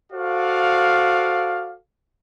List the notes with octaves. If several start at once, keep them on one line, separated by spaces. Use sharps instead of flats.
F#4 A4 C5 D5 F5